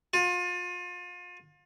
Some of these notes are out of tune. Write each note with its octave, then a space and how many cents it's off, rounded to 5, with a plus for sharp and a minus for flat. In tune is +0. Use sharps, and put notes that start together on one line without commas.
F4 +35